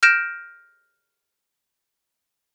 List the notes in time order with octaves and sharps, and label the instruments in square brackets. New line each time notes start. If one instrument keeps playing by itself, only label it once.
[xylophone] F6 G6 A#6 D7 E7